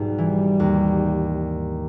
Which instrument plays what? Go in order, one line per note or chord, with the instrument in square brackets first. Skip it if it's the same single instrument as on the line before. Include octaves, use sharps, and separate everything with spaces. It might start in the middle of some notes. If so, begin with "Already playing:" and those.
Already playing: [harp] B1 G#2 [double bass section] G3
[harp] E3
D#2